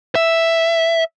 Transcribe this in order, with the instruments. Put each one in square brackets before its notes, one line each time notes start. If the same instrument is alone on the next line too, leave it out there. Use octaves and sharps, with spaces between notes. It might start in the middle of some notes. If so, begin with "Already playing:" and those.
[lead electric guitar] E5